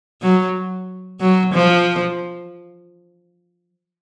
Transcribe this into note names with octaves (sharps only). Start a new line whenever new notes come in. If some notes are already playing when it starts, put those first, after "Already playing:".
F#3
F#3
F3